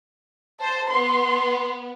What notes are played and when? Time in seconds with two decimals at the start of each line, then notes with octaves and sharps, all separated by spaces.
0.61 C5 A5
0.90 B3 C6